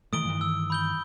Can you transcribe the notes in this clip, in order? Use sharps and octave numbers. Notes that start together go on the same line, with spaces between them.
D#3 E3 A3 D#6 D7 G7
G2 D#3 E3
E6
B5 G6 G7